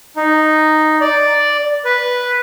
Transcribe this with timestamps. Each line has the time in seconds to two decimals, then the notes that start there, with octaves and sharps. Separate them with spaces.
0.16 D#4
1.01 D5
1.85 B4